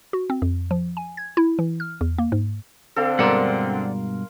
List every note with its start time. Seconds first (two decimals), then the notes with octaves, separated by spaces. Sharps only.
0.13 F#4
0.30 C4
0.42 F2
0.71 F3
0.97 G#5
1.17 G#6
1.37 E4
1.59 E3
1.80 F6
2.01 E2
2.18 A#3
2.32 G#2
2.96 D3 C4 A4 F5
3.19 G2 B2 G#3 A#4 D5 F#5 C6